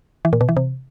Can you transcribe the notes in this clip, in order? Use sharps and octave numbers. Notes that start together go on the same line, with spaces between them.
E3
A#2
B2
E3
C3